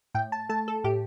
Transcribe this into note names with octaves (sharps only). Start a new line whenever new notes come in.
A2 G5
A5
A3 A5
A4
A2 G4